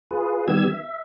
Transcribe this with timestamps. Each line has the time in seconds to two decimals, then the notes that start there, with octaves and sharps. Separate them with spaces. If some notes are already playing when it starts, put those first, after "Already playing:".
0.11 F4 G#4 B4
0.48 D#3 G3 B3 G4 E6 G#6
0.67 E5